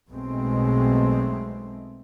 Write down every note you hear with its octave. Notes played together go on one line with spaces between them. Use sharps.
B1 B2 G#3 A3 C4